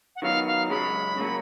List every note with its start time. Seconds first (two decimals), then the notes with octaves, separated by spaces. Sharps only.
0.15 F#5
0.22 D#3 F#3 B3 D#4 F5
0.46 F5
0.70 F#2 C#3 G#3 C#4 B5
1.17 C#3 F#3 A#3 C#4